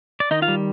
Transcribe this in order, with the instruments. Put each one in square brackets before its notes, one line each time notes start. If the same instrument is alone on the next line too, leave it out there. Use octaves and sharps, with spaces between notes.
[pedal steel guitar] D5
D#3 D#4 D#5
F4 F5
G3